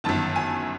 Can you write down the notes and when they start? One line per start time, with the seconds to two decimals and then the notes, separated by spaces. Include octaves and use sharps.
0.04 G1 F#2 D#3 A5
0.36 G#5